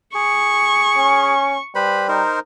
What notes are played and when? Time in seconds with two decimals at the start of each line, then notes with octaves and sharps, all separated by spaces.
0.15 G#4 C#6
0.97 C#4
1.75 G3 B4 C5 B5
2.09 D#4 A#4 C5